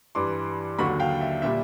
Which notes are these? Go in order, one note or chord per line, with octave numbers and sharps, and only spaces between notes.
G2 E3 G3 C6 D6
D#2 D3 F#3 B5 C#6
F5 G5
E5
A#2 G3 E5